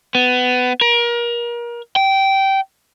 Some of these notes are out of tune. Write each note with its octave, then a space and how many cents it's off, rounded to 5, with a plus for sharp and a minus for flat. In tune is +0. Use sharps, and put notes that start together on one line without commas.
B3 +20
A#4 +30
G5 -15